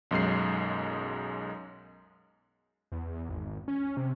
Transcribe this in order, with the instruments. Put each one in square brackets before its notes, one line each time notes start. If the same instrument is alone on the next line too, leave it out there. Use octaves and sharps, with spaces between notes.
[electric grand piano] B1 F#2 G#3 C7
[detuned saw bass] E2
G#1
C#4
C3